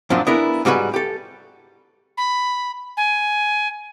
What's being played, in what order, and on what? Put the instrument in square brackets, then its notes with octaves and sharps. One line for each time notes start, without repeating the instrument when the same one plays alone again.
[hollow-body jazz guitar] F#2 A#2 F3 F#3 D4
B3 D4 E4 G#4 A#4
G#2 G3 C#4 F#4 B4 G#5
G4 A4
[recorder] B5
G#5